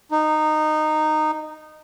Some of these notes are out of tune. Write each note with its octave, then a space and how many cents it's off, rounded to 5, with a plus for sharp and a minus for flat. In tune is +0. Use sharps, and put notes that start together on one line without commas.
D#4 -15